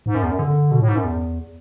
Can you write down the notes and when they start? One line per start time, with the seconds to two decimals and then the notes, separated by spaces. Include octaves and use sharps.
0.06 G#2
0.15 F#2
0.22 E2
0.30 F#2
0.39 D3
0.71 B2
0.80 A2
0.88 G#2
0.96 F#2
1.04 E2